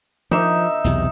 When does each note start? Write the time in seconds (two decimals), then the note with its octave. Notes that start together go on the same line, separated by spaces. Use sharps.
0.31 F3 D#4 E5
0.84 B1 E2 C3